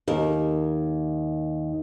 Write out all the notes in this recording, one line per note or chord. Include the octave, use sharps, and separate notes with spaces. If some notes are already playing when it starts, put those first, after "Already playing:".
D#2 A#4